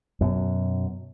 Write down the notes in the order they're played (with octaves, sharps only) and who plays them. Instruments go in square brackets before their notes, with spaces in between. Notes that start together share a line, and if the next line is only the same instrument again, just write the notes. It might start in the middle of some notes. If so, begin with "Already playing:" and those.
[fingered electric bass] F#2 B2